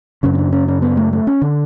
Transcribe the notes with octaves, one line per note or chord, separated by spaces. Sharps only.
F#2 C#3 C#4
C#4
D4
C#4
C#4
B3
A3
A3
C#4
D3